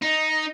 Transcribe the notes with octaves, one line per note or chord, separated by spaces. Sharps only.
D#4